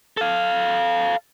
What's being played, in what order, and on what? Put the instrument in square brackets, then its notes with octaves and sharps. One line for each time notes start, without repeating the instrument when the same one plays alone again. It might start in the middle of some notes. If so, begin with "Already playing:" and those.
[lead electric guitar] A4 F5